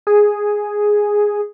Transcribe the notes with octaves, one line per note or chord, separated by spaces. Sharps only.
G#4